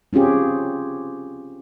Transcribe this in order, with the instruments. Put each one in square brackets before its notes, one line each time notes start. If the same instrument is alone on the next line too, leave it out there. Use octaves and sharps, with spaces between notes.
[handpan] C4 C#4 F4 G4 G#4